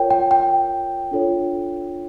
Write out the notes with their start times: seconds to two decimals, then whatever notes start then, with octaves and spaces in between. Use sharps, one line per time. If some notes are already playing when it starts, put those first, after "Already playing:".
Already playing: F4 A#4 C#5 G5
0.11 G5
0.31 G5
1.11 D4 F4 A4 C#5